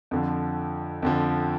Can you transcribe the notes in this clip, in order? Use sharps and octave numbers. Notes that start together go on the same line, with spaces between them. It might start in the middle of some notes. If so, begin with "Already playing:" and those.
F2 D3 F3
F2 D3 F3